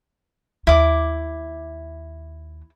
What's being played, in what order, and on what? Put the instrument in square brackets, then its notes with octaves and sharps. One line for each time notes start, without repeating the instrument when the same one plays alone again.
[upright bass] D#2 [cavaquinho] E4 D6